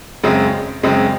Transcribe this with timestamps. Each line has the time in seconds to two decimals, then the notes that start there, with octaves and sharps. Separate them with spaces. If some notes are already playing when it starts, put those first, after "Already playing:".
0.23 F#2 C#3 G#3 C4
0.83 F#2 C#3 G#3 C4